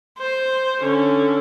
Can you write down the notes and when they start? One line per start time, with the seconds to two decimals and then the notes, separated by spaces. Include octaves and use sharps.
0.19 C5
0.80 D3 C#4